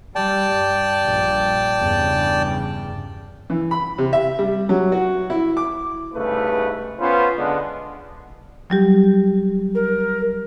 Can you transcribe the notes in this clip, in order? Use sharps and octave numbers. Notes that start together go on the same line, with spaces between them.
G3 D5 G5 A5
G2
A#1 G2
E2 G2 C#3
E3
B5
C3
E5
G3
F#3
F#4
E4
D6
C2 G#2 C#3 A3 B4
B3 C#4 F4 B4 C5
D3 G#3 B3 D4
F#3 G3 G4
A#4